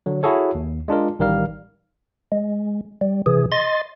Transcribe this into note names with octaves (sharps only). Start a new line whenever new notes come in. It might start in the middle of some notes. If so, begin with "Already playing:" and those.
D3 F#3
E4 F#4 G#4 A4 C#5
D#2
G#3 D4 F4 A#4
A1 D#3 G3 A#4 F5 F6
G#3
G3
C3 E3 G#4
D#5 C6 A6